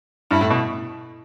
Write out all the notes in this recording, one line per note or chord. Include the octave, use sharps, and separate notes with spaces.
G2 E4
A2
B2